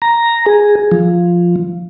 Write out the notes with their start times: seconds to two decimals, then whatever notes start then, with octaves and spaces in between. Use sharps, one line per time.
0.02 A#5
0.46 G#4
0.92 F3